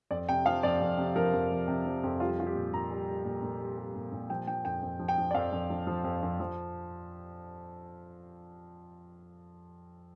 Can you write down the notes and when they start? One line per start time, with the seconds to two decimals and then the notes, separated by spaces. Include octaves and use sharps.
0.11 F2 D5
0.29 C3 G5
0.46 F3 F5
0.63 F2 D5
0.81 F2
0.98 C3
1.16 F3 A#4
1.34 F2
1.51 F2
1.68 C3
1.85 F3
2.03 F2
2.20 G3 F4
2.39 G3 F4
2.47 G4
2.56 A#2
2.73 A#2 A#5
2.91 G3
3.08 G3
3.25 A#2
3.43 A#2
3.60 G3
3.77 G3
3.95 A#2
4.12 A#2
4.30 F3 G5
4.47 F3 G5
4.65 F2 G5
4.82 F2
4.99 F3
5.08 G5
5.18 F3
5.31 D5
5.34 F2 F5
5.52 F2
5.70 F3
5.87 F3
6.04 F2
6.23 F2
6.40 F3